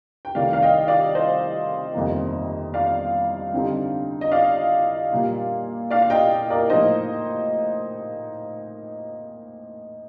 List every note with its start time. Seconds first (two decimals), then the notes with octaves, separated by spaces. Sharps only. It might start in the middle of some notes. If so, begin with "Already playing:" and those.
0.25 G5
0.35 C2 C3 D#3 A3 D#4 D5 F5
0.53 F5
0.62 D#5 G5
0.88 D5 F5
1.15 C5 D#5
1.94 G1 F2 C3 D#3 A#3
2.74 D5 F5
3.52 G2 D3 G3 C4 D#4
4.21 D#5
4.32 D5 F5
5.11 A#2 G3 A#3 F4
5.91 D5 F5
6.02 F5
6.10 D#5 G5
6.50 A#4 D5
6.70 A2 F3 A#3 D#4 C5 D#5